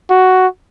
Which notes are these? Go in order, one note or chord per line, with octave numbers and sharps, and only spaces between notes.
F#4